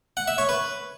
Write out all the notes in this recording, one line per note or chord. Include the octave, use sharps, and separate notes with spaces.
F#5
E5
C#5
B4